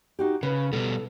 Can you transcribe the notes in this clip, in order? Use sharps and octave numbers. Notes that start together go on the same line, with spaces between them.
D#4 F#4 G4
C#3 B4
B2 G3 A4